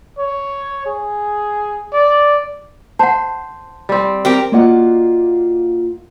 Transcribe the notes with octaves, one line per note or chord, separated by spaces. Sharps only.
C#5
G#4
D5
C5 F#5 A5
G3 C4
C4 G4 A#4
A#3 F4 F#4 D5 D#5 F#5